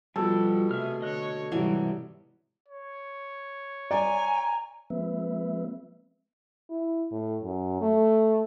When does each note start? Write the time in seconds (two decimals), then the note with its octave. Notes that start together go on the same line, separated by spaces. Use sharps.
0.16 B2 F3 G3 F4 F#4 A4
0.71 C3 A3 G#4 E5 F6
1.02 D3 C#5 D#5 F#6
1.52 G#2 C3 E3 F#3 G3 G#5
2.68 C#5
3.91 D5 G#5 A#5
4.90 F3 G#3 A#3 C4 B4 E5
6.70 E4
7.11 A2
7.42 F#2
7.81 A3